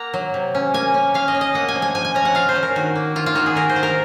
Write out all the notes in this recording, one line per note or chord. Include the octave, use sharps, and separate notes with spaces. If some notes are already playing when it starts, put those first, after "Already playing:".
Already playing: A#3 F#5 A#5
F#3
C3
C#4
A#3 G#5
C#4
C#4 F5
D#5
C#4
D#5
A#3 F#5
G#5
F3
G#5
F3 G#5
G#5
C#4 A#5
F#5
F4 F5
C5
C#4
A#4
D#3 F#4
A#3
D#3 F4
F4
D#3 F#4
G#4
D#3 A#4
C5
F4
A#4